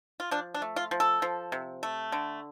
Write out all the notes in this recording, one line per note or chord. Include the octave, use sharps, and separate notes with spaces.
F4
F3 D4
D4
A3
F4
F3
A4
F3
C3
A3
D3